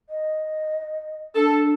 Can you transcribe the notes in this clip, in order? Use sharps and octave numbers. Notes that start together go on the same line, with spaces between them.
D#5
D4 A4